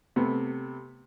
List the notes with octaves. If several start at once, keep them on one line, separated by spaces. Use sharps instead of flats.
C3 A3 B3